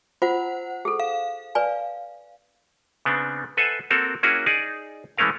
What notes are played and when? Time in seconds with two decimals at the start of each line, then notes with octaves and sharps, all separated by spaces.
0.22 F4 C5 F#5
0.85 G#4 A4
1.00 F5
1.55 B4 D5 G#5
3.05 C#3 B3 C4 D4
3.57 A4 B4 C5 E5 F#5 G#5
3.90 A#3 C4 F#4 A4 A#4
4.23 A#3 C#4 E4 F#4 G#4
4.46 D#4 G#4 D5
5.17 E3 G#3 A3 C#4 A#4 F5